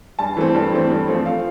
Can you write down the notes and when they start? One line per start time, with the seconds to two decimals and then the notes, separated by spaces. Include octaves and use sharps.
0.19 G2 A5
0.37 E3 A3 C4
0.55 G2
0.73 E3 A3 C4
0.90 G2
1.08 F3 A3 C4
1.26 F5